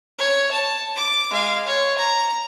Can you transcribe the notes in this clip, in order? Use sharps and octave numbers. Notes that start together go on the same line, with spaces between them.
C#5
A5
D6
G#3 F5
C#5
A#5